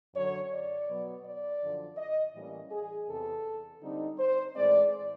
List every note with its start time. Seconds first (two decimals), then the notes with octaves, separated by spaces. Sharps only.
0.14 F#2 D3 F#3 C#5
0.52 D5
0.88 B2 F#3 B3
1.24 D5
1.62 F#2 D3 F3
1.97 D#5
2.35 A2 E3 G3 A#3 C#4
2.72 G#4
3.08 E2 C3 E3 A4
3.82 D3 G3 C4 D#4
4.18 C5
4.55 A2 E3 G#3 C4 D5